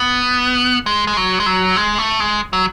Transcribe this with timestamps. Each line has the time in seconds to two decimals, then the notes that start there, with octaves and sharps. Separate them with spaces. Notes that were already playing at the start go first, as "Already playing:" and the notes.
Already playing: B3
0.86 G#3
1.07 G#3
1.17 F#3
1.40 G#3
1.46 F#3
1.76 G#3
1.98 A3
2.20 G#3
2.53 F#3